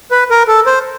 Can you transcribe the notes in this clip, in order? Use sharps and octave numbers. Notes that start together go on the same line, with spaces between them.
B4
A#4
A4
C5